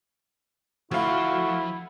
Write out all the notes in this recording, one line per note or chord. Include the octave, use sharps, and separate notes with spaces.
D2 F3 E4 F#4 F5